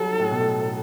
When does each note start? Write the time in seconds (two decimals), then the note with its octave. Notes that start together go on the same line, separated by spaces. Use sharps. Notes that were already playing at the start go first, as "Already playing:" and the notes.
Already playing: F#3 G3 A4
0.19 A2
0.31 B2
0.41 A2
0.61 A2